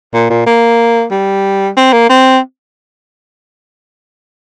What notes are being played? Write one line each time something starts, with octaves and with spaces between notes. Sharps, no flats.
A#2
A#2
A#3
G3
C4
A#3
C4